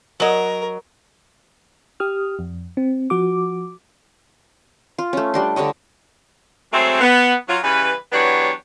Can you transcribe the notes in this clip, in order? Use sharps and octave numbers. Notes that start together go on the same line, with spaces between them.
F#3 A#4 D#5
G4 D#6 F6
F2
C4
F3 F#4 D6
F4
A3 C#4
G3 D4 C6
D3 G3 C#5 D#5
F#3 G#3 A3 C4
B3
F#3 F4
C#3 E3 G3 B4
E3 F#3 B3 D4 G4 C#5